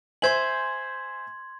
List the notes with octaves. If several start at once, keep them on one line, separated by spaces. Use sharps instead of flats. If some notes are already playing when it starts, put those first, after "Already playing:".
C5 E5 G#5 C6 G#6 F#7